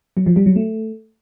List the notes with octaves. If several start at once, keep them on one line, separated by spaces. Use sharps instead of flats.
F#3
F3
G3
F#3
A3